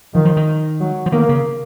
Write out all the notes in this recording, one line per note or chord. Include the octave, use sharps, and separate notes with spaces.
D#3 F3
F3
D#3
F#3
F3
D#3 A#3
C#3